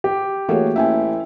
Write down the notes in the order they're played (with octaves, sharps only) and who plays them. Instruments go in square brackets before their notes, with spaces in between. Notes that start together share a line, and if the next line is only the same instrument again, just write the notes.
[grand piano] G4
[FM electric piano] E3 A3 A#3 [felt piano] F#4 G#4 C#5
[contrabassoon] A1 [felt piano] E5 G5 G#5